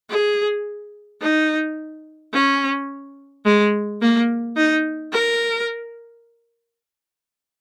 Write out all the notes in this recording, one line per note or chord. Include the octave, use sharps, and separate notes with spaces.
G#4
D#4
C#4
G#3
A#3
D#4
A#4